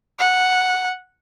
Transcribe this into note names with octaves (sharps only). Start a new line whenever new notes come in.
F#5